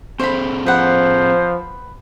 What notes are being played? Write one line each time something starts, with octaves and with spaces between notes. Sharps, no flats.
C4 G#4 A4 C5 B5
F3 B4 C5 F#5